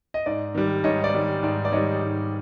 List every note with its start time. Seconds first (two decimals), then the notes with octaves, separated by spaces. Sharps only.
0.14 D#5
0.26 G#2 D5
0.55 D#3 G3
0.84 G#2 C#5 D#5
1.04 D5
1.14 D#3 G3
1.43 G#2 D5
1.65 D5
1.72 D#3 G3 C#5 D#5
2.02 G#2